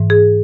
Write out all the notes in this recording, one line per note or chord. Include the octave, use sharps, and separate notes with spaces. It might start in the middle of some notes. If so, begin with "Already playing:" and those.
Already playing: G#2 E3
G#4